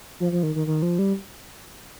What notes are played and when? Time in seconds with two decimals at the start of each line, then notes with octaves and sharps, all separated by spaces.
0.20 F3
0.32 F3
0.43 D#3
0.55 D#3
0.67 D#3
0.82 F3
0.99 G3